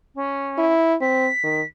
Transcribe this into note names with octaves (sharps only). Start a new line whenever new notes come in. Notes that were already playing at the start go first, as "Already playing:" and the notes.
C#4
E4
C4 B6
D#3